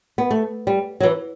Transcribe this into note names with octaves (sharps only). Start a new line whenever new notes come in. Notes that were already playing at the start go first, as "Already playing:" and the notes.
B3
A3
G3
F#3
E3